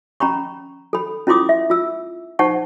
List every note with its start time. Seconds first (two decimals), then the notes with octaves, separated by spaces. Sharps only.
0.20 C#4 A#5 B5 C#6
0.93 A4 B5
1.27 C#4 E4 F4 C6 D6 D#6
1.49 E5
1.70 F4 E6
2.39 D#4 C5 F#5 A5 C#6